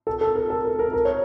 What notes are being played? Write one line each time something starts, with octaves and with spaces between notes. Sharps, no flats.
A4
A4
A#4
A4
A#4
A#4
A#4
C#5